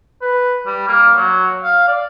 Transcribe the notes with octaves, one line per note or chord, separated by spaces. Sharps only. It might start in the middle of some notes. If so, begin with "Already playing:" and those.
B4
G3
A#3
F#3
F5
D5